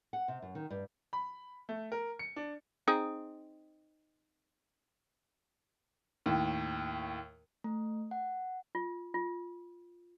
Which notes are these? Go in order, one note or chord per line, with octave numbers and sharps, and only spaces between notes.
F#5
C3
F#2
D#3
G2
B5
A3
A#4
C#7
D4
C4 D#4 G#4
D#2 A2
A3
F#5
F4
F4